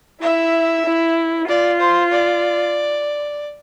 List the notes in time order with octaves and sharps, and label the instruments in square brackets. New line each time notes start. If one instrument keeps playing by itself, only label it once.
[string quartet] E4 [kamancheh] E5
[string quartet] E4
[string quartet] F4 [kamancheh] D5
[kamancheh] C5
D5